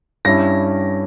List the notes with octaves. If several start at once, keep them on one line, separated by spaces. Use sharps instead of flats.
G2 G3 C#4 E4 A#6